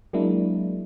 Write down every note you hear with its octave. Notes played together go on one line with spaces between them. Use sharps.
F#3 G#3 A#3 D4 E4